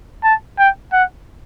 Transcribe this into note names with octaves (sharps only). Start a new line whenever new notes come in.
A5
G5
F#5